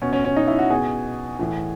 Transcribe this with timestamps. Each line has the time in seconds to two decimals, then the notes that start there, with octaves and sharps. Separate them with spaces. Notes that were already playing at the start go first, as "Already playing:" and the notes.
0.02 B2 C#4
0.13 C#4
0.24 C#4
0.36 D#4
0.47 E4
0.59 F#4
0.70 B2 G#4
1.39 A2 E3